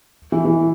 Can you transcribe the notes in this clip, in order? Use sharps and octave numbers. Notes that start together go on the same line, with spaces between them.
E3
E3